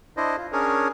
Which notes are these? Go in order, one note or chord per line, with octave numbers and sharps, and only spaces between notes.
D4 E4 C5 D#5
F4
C#4 D4 G#4 A#4 C#5